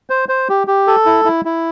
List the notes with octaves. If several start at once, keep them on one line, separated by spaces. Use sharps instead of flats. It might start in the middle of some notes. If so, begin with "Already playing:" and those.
C5
C5
G4
G4
A4
E4
E4
E4